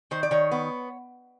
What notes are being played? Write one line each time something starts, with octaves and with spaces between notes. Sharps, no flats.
D#3 C5
D5
D#3 C#5
B3